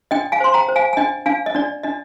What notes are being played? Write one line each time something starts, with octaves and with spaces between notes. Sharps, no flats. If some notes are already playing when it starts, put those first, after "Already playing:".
D4 D#5 G5
F5 G#5
C5 C6
G5 A#5
C5
F5 G#5
G#5
D4 D#5 G5
D4 F5 G#5
D#5
D4 D5
D4 D#5